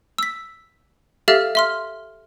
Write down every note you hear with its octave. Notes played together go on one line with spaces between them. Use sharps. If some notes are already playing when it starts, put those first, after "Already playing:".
E6 B6
G4 A4 E5 F5 F6 A6
E5 C6 F6